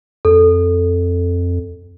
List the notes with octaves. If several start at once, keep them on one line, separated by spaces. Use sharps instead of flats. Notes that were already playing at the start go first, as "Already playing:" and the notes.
F2 A4